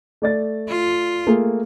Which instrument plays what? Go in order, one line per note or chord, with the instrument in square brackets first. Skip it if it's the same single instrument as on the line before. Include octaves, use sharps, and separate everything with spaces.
[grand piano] A3 D5 A6
[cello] F4
[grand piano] A3 A#3 G#4